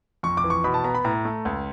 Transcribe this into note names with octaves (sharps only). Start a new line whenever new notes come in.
F2 C#6
D6
E3
C#6
B2 B5
A5
B3 A#5
B5
A2 A#5
A3
C#2